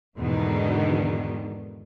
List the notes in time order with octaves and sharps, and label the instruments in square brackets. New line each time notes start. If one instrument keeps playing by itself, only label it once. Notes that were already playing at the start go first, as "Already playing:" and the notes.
[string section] E2 G#2 B2 D3 D#3